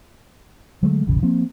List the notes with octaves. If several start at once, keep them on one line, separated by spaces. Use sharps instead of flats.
D3 F#3 G#3 A3
E1 A1 C#3
F3 A#3 C4